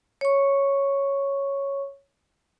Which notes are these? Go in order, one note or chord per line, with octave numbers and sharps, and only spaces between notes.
C#5 C#6